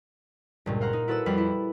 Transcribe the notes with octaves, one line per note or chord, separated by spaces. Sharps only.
C#2 G2 A#2
C5 F5 F#5 A#5
D#4
E4 F#4 A4 B4 C#5 E6
F2 G3 E4 B5 F6
E4